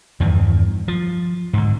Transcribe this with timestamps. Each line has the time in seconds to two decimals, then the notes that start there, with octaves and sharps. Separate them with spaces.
0.20 E2 G2 D#3 E3
0.88 F3
1.53 G#2 D3